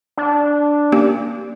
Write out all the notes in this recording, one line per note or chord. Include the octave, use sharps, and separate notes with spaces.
D4
A#3 C#4 G4